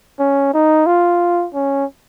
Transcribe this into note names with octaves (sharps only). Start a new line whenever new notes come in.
C#4
D#4
F4
C#4